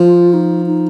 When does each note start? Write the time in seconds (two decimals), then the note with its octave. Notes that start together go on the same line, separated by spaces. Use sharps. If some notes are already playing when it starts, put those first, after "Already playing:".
Already playing: F3 F4
0.34 D#4
0.66 D#4